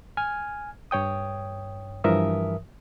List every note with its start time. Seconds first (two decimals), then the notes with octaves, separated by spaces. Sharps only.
0.17 G#5 F6 G#6
0.91 G2 C#5 G5 D#6
2.04 G2 E3 F3 A#4 E5 D#6